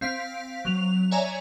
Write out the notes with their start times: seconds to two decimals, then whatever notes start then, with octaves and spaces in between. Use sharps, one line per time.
0.01 C4 F5 B6 D7
0.65 F#3 F7
1.11 C#5 D5 E5 G#5 A#5